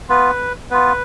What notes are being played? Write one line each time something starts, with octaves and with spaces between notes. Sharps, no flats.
B3 F4 B4
B3 F4 B4